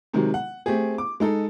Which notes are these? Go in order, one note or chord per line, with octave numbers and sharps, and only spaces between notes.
C3 D#3 F#3 G#3
F#5
A3 C4 G4 G#4
D6
G#3 D#4 A4